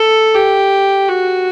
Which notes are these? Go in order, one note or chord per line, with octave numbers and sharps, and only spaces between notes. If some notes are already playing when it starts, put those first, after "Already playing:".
Already playing: A4
G4
F#4